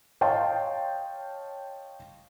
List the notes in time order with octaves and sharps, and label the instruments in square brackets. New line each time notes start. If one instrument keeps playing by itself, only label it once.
[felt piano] C#5 D#5 F5 G5 A5 C6